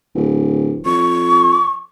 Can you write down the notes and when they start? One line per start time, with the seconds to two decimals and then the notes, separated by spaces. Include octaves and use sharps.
0.15 D1
0.86 F2 C#6